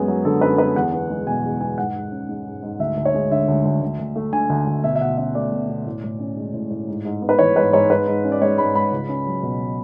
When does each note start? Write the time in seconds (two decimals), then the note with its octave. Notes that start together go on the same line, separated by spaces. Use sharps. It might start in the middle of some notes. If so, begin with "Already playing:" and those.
Already playing: F#2 G#3 B3 G#4
0.08 F#3
0.25 D3 A4
0.41 F#2 B4
0.58 B3 B4
0.76 E2 F#5
0.93 B3
1.10 G#3
1.27 B2 G#5
1.44 E2
1.61 B3 G#5
1.78 G#2 F#5
1.95 G#2
2.12 C#4
2.29 G#3
2.46 G#2
2.62 G#2
2.79 D2 E5
2.97 D2
3.05 C#5
3.14 G#3
3.31 D3 E5
3.48 D2
3.65 D2
3.82 D2
3.99 D2
4.16 A3
4.33 D3 G#5
4.50 D2
4.67 D2
4.84 B2 E5
4.96 E5
5.01 B2 F#5
5.17 C#4 E5
5.35 A3 D5
5.52 B2
5.69 B2
5.86 A2
6.04 A2
6.19 C#4
6.37 G#3
6.54 A2
6.70 A2
6.88 G#2
7.05 G#2
7.22 B3
7.29 B4
7.39 E3 C#5
7.56 G#2 B4
7.73 G#2 C#5
7.90 G#2 B4
8.07 G#2
8.25 C#4
8.32 D5
8.41 G#3 C#5
8.58 G#2 B5
8.75 G#2 B5
8.92 C#2
9.09 C#4
9.26 F#3
9.43 B2